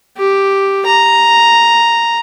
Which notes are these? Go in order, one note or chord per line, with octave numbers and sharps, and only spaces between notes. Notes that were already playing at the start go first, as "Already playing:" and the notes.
G4
A#5